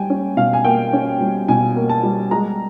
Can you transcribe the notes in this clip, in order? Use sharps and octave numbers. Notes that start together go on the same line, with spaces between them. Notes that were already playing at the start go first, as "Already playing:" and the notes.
Already playing: G3 G5 G#5
C#4
B2 F5
G#5
A#3 G5
C#4
G3
B2 G#5
A#3
A5
G3
G#3 A#5